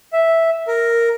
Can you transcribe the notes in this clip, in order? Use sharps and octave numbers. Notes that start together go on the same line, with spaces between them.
E5
A#4